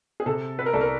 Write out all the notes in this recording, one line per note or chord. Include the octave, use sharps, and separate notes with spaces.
G#4
C3 A4
B4
A#4
C2 A4
A#4